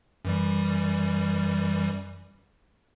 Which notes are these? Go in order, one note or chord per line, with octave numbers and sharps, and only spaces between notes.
F#2 E3 G3